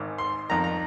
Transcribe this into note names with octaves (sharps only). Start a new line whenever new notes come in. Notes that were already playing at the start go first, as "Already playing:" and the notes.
Already playing: G#1 G#2 D#3
C6
F2 D#3 A#5
A#5